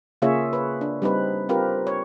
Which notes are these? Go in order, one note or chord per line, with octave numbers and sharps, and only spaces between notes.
C#3 A#3 F4 G#4 C#5 E5
B4 C#5
D4
G3 C4 D#4 B4
C4 F4 G4 A#4 B4
C#5